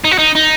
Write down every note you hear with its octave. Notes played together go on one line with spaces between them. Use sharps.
D#4
F#4
D#4
D#4